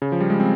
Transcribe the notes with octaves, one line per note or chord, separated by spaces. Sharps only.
C#3
F3
G3
G#3
C4